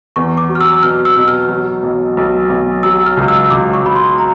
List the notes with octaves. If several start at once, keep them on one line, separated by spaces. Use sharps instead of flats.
E2 C#6
D6
F#3
F6
E6
B2 F6
E6
B2
F6
F#3
B1
B1
B1
F#3 E6
F6
C#2
E6
C#2 D6
C#6
F#3 B5
C6
A#5